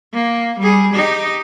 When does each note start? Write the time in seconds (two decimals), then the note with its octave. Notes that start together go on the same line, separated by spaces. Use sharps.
0.13 A#3
0.59 G3 G#4
0.93 D#4 G4